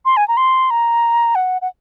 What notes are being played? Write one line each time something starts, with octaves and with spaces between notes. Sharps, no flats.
C6
G#5
A#5
C6
A#5
F#5
F#5